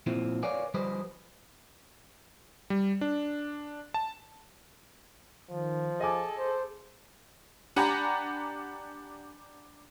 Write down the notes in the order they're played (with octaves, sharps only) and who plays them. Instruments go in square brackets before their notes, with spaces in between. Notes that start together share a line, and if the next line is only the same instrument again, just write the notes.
[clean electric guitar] A#2 F3 C4 E4
A#4 B4 C#5 D5 F5 G#5
F3 G3 G4 B4 C5 D#5
[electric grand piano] G3
D4
A5
[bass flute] D#3 [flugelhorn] F3
[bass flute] G#4 [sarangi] A4 [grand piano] D#5 G#5 D6
[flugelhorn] C5
[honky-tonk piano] D4 G4 F#5 G#5 A#5 B5